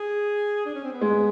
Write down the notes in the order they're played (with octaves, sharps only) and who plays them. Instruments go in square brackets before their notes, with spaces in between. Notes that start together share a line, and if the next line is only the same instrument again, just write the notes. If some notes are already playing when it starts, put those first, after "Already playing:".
Already playing: [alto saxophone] G#4
D4
C#4
C4
B3
[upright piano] G#3